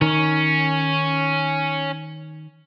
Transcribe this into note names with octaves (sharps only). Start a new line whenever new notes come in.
D#3 C#4